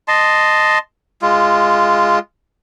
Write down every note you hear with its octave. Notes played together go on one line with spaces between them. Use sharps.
D#5 A5 C6
G#3 F4